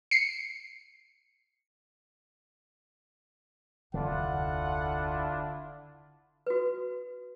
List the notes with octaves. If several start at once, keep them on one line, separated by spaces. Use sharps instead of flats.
C7 C#7
F1 D2 D3 D4 E4 F4 F#5
F#4 B4